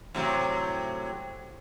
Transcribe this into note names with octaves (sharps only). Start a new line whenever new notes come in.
A2 C3 F#3